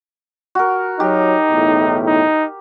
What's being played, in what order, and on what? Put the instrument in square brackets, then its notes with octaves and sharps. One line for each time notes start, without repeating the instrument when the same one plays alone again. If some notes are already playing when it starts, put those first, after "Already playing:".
[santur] F#4 A#4
[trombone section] F#3 [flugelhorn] D#4 [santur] G4
[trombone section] B1 E2 A2
[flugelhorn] D#4